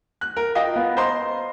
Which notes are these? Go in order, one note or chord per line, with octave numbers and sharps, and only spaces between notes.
F#6
A#4
F4 D#5 F5 G5
B3
C5 D#5 A#5 C6